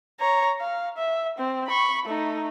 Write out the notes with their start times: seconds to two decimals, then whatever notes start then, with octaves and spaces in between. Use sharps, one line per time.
0.20 C#5 A#5
0.61 F5
0.97 E5
1.38 C4
1.67 B5 C#6
2.06 A3 D#4